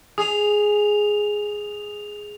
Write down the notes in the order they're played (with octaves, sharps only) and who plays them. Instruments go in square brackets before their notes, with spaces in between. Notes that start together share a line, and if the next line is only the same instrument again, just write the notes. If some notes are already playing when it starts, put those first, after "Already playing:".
[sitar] G#4 [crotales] D#6 F7